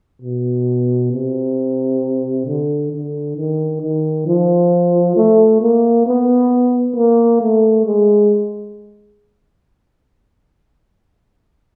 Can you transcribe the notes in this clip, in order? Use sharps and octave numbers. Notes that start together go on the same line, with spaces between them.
B2
C3
D3
D3
D#3
D#3
F3
A3
A#3
B3
A#3
A3
G#3